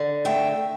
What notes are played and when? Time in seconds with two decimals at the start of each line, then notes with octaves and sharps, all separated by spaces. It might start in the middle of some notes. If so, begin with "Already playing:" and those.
Already playing: D3
0.25 A3 E5 G5